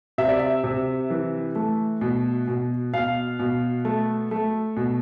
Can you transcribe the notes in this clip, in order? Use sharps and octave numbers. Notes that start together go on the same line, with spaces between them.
C3 E5
D5
E5
C3
E3
A3
B2
B2
B2 F5
B2
A3
A3
B2